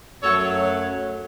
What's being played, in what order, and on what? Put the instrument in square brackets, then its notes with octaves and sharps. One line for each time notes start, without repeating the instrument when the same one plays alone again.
[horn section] F#2 F#3 A3 A4 C#5